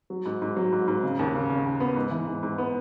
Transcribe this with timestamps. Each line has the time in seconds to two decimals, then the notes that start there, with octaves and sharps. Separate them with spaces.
0.10 F#3
0.26 G#2
0.42 G#2
0.57 F#3
0.72 G#2
0.88 G#2
1.03 C#3
1.19 D#2
1.34 C#3
1.50 C#3
1.65 D#2
1.80 B3
1.96 G#2
2.11 E3
2.27 G#2
2.43 G#2
2.58 B3